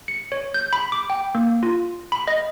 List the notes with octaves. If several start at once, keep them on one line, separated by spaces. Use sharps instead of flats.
C#7
C#5
G6
B5
D6
G5
A#3
F4
B5
D#5